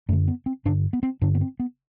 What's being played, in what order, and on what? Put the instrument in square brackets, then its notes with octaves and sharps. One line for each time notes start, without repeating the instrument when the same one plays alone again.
[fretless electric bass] F#2 A3
D3
B3
C4
G2 D3 D4
B3
C4
G2 D3 D4
B3
C4
B3